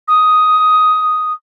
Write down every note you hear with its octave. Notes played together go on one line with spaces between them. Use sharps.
D#6